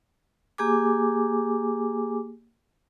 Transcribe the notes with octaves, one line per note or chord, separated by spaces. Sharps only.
A#3 G4 G#4 G#5 D6